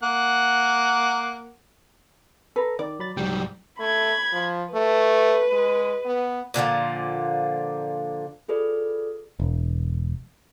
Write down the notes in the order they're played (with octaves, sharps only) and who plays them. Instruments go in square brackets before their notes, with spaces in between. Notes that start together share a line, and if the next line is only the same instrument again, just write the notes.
[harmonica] A#3 F#5
[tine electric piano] A4 A#5 [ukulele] B4
[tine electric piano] D#3 [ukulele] D5
[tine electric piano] F#3 B5 A6
[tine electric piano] C2 G#2 G5 [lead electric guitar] F#3 G3
[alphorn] A3 [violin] B5 G#6
[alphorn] F3
[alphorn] A3 [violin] B4
[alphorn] G#3
B3
[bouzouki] A#2 D3 D#3 F3
[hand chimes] F4 G#4 A4 B4 D5
[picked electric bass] E1